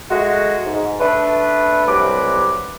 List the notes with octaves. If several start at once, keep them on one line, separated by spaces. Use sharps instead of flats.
G#3 A3 F#4
G#2
A3 D4 B4
C2 C3 F#3 B4 D6